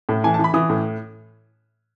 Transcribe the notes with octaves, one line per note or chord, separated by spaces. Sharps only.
A2
E3 G#5
A5
E3 B5
E3 D#6
A2